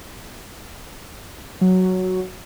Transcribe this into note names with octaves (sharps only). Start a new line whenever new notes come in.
F#3